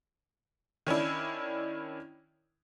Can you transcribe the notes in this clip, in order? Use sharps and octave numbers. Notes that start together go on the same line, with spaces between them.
D#3 C#4 D4 E4